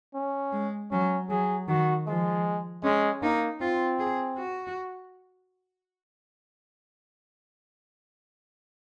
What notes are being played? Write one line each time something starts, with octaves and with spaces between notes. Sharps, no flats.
C#4
G#3
F#3 C#4
F#3 G#4
D#3 F#4
F3 G#3
G#3 C#4
A#3 D#4
C4 F4
G#4
F#4